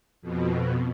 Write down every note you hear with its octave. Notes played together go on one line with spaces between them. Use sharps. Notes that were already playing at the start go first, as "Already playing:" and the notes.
F2 B2